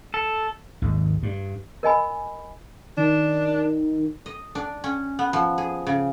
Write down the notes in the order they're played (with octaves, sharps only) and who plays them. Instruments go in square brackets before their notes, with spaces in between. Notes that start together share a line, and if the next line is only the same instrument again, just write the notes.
[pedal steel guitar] A4
[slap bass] G#1 D#2
G2
[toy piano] A#4 D#5 G#5 B5
[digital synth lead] D#3 [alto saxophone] D4
[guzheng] D#5
D4
C#4
B3
F3
G#4
C#3